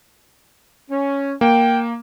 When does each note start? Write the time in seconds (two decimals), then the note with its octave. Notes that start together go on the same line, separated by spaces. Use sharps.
0.90 C#4
1.41 A#3 G5